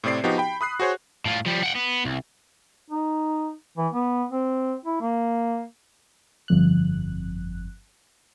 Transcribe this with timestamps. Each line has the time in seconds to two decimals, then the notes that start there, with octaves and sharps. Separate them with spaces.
0.04 A2 C3 C4 D5 C7
0.24 F3 B3 D#4 F#4 G4
0.38 G5 B5
0.61 B5 D#6 F#6 C7
0.80 F#4 G#4 C5 C#5
1.25 A2 F4
1.46 F3 G3
1.63 F#5 G5
1.75 B3
2.05 C2
2.90 D#4
3.77 E3
3.93 B3
4.31 C4
4.85 E4
5.00 A#3
6.48 G1 F2 F#6